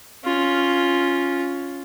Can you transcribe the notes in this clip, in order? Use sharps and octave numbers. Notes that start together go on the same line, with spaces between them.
C#4 F4